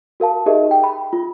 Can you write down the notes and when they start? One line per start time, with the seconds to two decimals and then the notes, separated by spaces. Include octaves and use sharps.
0.20 F#4 A#4 F5 A5
0.46 D#4 G4 G#4 A#4 D#5 E5
0.71 G5
0.84 B5
1.13 F4